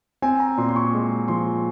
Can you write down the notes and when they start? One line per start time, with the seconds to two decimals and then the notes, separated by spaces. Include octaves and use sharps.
0.22 C4 G#5
0.40 A#5
0.58 A#2 C6
0.68 C6
0.76 C#6
0.93 G#3
1.28 F3 C6